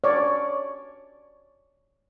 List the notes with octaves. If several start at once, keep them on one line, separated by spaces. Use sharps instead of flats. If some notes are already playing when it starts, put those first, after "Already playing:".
C#5 D5